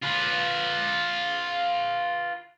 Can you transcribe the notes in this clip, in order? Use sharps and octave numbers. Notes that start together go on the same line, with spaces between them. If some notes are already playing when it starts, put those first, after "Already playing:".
F4 B4